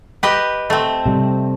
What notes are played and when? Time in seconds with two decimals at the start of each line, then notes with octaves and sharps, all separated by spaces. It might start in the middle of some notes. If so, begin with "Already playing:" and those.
0.23 G4 B4 D#5
0.70 A3 C4
1.06 C3 G3